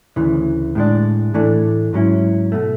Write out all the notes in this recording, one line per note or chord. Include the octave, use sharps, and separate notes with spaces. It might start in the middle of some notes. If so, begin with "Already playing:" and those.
D2 C#3 E3
A2 G#3 D4
A2 E3 A3 D4
G#2 F#3 C#4 E4
B2 A3